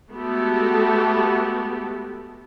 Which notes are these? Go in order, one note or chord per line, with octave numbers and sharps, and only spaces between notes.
G#3 A3 B3 F#4 G4 A4